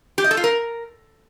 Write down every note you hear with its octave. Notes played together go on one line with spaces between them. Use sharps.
G4
D#5
A4
F4
A#4